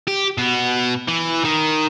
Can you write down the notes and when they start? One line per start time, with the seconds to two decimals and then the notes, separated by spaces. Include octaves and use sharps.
0.08 G4
0.38 B2 B3
1.08 E3
1.45 D#3